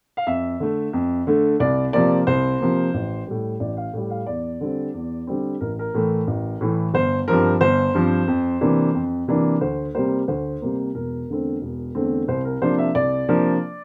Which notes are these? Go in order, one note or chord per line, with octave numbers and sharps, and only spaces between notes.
F5
F2 E5
D3 A3
F2
D3 A3
C2 D5
C3 F3 A#3 D5
C2 C5
C3 F3 A#3
A1
A2 G3
A1 D5
F5
A2 G3
F5
E2 D5
D3 G3 C4
E2
D3 G3 C4
A1 A#4
A#4
A2 E3 A3
A1
A2 E3 A3
G1 C5
G2 F3 C4 A#4
G1 C5
G2 F3 C4
F2
C3 E3 A#3 D4
F2
C3 E3 A#3 D4
D2 C5
C3 G3 A#3 C5
D2 C5
C3 G3 A#3
E1 A#4
E2 D3 A3 C4
E1
E2 D3 A3 C4
C2 C5
A#4
C3 F3 A#3 D4 C5
E5
C2 D5
C3 F3 A#3 D4